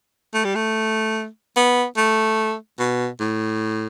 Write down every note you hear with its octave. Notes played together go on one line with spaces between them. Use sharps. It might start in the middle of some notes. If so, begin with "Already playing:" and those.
A3
G3
A3
B3
A3
B2
A2